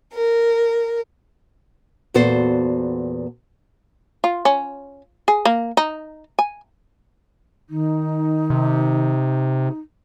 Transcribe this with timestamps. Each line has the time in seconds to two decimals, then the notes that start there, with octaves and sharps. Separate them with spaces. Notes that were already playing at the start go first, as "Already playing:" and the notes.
0.13 A#4
2.14 E2 A#2 B3 F#4 A4 C5
4.24 F4
4.45 C#4
5.28 G#4
5.45 A#3
5.77 D#4
6.39 G#5
7.70 D#3 D#4
8.50 C3